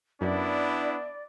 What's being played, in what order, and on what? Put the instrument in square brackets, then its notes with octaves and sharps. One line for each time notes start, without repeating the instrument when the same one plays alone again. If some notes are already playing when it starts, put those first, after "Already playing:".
[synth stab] F#2 [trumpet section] B3 D4 E4 [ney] D5